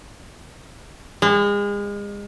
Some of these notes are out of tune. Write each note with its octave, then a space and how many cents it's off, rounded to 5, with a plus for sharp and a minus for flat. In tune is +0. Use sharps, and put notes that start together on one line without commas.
G#3 -35